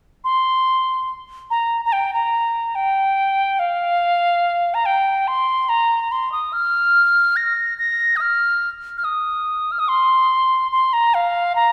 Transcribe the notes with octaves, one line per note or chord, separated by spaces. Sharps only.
C6
A#5
A#5
G5
A#5
G5
F5
A#5
G5
C6
A#5
C6
D#6
F6
A#6
A#6
D#6
F6
F6
D#6
F6
D#6
C6
C6
A#5
F5
A#5